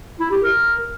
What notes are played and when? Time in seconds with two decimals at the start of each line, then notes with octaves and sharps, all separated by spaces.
0.20 E4
0.32 G4
0.43 A#4